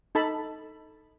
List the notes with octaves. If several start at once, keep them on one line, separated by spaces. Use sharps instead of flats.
D#4 A4 A5 B5